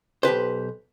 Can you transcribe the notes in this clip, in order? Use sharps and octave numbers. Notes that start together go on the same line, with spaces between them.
B1 G4 B4 C5